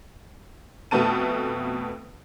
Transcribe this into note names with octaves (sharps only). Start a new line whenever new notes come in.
F2 B2 A3 B3 A5 D#7